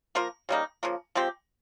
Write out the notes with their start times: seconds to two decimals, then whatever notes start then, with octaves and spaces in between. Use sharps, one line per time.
0.15 F3 A#3 F4 A#4
0.49 C#3 G3 A#3 D#4
0.83 C#3 F3 A#3
1.15 F3 G#3 C4 G4